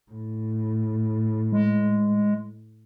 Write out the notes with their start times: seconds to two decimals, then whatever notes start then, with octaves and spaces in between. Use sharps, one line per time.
0.11 A2
1.53 G#3